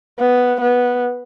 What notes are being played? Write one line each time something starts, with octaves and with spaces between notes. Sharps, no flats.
B3
B3